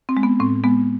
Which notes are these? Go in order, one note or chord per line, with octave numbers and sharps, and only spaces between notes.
C4
G#3
B3
A2 C4
G#3 B3